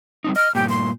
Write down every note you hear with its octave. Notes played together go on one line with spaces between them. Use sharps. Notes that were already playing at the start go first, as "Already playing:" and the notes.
G3 C4 D#4
D#5 F6
G2 A#2 G4
C6